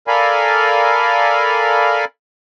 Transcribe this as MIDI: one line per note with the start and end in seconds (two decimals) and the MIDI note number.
0.08 2.05 69
0.08 2.05 70
0.08 2.05 74
0.08 2.05 77
0.08 2.05 80
0.08 2.05 83